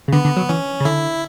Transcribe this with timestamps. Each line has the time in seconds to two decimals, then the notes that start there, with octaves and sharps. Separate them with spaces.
0.08 C#3
0.12 D3 B3
0.25 D3
0.36 F#3
0.49 E3 C#4
0.80 C#3
0.85 D3 E4